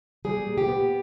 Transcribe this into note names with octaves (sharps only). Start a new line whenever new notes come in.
G3 G#4
A#2
G4
B3